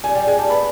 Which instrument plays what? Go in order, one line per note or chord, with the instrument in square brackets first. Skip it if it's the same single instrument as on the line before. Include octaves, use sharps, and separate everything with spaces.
[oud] G3 [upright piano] G#5
[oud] G3 [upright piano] G5
[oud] G#3 [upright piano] G#5
[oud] G3 [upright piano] A5
[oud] B3 [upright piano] B5